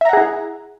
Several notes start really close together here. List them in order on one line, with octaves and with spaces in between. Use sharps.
E5 A#5 F#5 G#4 E4